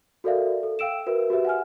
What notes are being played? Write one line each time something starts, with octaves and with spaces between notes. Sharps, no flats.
F#4 A4 A#4 D5 E5 F5
A4
F5 G5 E6 D7 E7
F#4 A#4 B4 E5
F#4 G4 B4 E5
F#5 G#5 F6